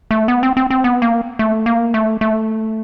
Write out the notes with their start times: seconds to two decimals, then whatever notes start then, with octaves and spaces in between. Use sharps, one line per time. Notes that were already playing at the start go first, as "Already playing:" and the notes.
0.11 A3
0.28 B3
0.43 C4
0.57 C4
0.70 C4
0.84 B3
1.02 A#3
1.39 A3
1.66 A#3
1.94 A3
2.21 A3